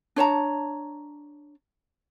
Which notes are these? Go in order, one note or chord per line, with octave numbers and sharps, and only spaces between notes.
D4 C#5 A5 A#5